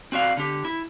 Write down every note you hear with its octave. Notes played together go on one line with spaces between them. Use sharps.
C4 F#4 D5 F5
D3 G4
E4